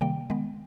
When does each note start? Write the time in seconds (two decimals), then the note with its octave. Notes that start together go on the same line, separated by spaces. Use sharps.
0.01 C3 D#3 G3 A#3 G5
0.30 D#3 G#3 B3